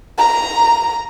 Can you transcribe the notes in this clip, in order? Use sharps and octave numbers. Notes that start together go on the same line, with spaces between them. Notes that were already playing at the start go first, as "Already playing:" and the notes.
A#5